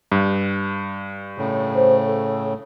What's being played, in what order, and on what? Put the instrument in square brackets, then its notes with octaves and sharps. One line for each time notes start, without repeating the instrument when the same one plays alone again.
[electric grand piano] G2
[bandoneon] A2 C#3
[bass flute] C5
A4